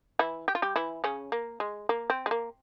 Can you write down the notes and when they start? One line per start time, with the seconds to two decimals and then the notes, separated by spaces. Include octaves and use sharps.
0.19 E3 E4
0.48 G4
0.55 F4
0.62 G3 G4
0.76 E3 E4
1.04 C#3 C#4
1.32 A#3
1.60 G#3
1.89 A#3
2.10 C4
2.26 G#3
2.31 A#3